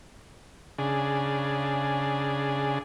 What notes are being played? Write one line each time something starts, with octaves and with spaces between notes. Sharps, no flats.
C#3 D4 G#4